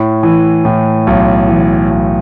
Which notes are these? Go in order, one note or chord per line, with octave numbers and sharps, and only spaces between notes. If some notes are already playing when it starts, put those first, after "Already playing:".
Already playing: A2
E3
A2
B1
E3
B1